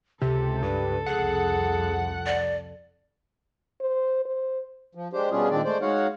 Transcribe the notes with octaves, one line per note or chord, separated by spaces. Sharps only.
C#2 C3 G4 A4
G2 B4
C2 F2 G#4 F#5
D5
C5
C5
F3
G#3 D4 G4 C5
B2 G3 C#4 D4 F4 G#4
A#2 D#3 G#3 C4 D4 D5
G#3 A3 C5 D5
G#3 D#4 F#4 C#5 F5 F#5